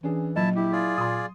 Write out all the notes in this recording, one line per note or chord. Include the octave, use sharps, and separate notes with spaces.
E3 C#4 D4 G#4
A#1 F#3 E4 A5
E4 G4
F4 G#4 D5
A#2 C6 D#6